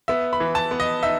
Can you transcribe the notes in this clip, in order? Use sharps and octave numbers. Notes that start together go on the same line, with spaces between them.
B3 E5
B5
E3
A5
B3
D#5
D#4 E5